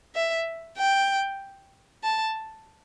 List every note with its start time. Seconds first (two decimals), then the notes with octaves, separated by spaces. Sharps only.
0.15 E5
0.78 G5
2.03 A5